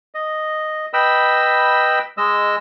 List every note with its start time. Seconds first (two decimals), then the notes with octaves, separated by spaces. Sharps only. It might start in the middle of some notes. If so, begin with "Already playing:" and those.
0.14 D#5
0.93 B4 D#5 G5 B5 E6
2.18 G#3 D#5 E6